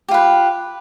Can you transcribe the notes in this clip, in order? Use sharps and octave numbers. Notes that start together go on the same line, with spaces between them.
F4 G4 B4